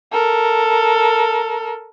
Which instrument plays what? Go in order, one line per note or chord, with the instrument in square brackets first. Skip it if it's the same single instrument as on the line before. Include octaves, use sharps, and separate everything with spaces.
[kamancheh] A4 A#4